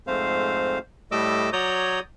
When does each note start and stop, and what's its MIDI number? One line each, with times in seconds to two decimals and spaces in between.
0.07 0.79 41
0.07 0.79 44
0.07 0.79 57
0.07 0.79 60
0.07 0.79 72
0.07 0.79 77
1.12 1.50 45
1.12 1.50 55
1.12 1.50 57
1.12 1.50 75
1.12 1.50 86
1.12 1.50 88
1.53 2.00 54
1.53 2.00 73
1.53 2.00 74
1.53 2.00 82
1.53 2.00 87
1.53 2.00 91